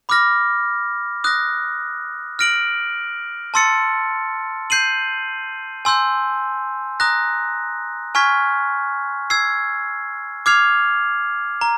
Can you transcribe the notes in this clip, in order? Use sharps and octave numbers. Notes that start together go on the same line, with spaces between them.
B5 D6 F6 A#6
D#6 F#6 A#6
F6 A#6 D7 F#7
A5 C6 E6 A6 C#7
G6 C7 D#7 F#7
G#5 C6 E6 G6
A#5 D#6 F#6 A#6
G#5 C#6 F6 G#6 B6
E6 G#6 C7
D6 F6 G#6 C7 F7
A#5